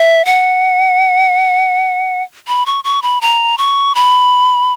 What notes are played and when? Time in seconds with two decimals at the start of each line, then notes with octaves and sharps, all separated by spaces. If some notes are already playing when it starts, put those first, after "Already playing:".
Already playing: E5
0.25 F#5
2.48 B5
2.66 C#6
2.84 C#6
3.02 B5
3.21 A#5
3.58 C#6
3.95 B5